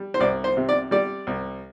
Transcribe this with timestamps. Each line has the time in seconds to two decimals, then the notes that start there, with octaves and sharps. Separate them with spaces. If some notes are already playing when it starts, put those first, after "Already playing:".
Already playing: G3
0.14 C5
0.20 C2 D5
0.44 C5
0.57 C3
0.69 D5
0.91 G3 D5
1.27 C2